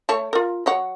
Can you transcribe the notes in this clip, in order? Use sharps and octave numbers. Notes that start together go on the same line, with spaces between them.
A3 C#5 A5
F4 A#4
F#3 C#5 F#5